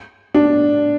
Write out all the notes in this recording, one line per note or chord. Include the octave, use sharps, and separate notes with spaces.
D4